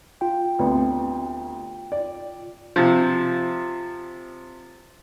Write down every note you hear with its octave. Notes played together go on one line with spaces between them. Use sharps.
F4 G5
D2 C3 B3
D5
C3 F3